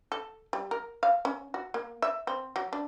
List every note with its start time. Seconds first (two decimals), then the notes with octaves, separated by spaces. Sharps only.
0.12 A4
0.53 G3
0.71 A#4
1.03 F5
1.25 C#4
1.54 F#4
1.74 A#3
2.02 E5
2.27 C4
2.56 F#3
2.73 D4